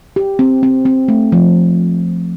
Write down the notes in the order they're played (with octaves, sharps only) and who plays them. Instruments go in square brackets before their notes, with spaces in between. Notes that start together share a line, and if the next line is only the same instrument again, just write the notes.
[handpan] G4
C4
C4
C4
A3
F3